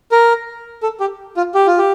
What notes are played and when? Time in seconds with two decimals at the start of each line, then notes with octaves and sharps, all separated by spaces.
0.12 A#4
0.83 A4
1.00 G4
1.37 F4
1.55 G4
1.67 F4
1.78 G4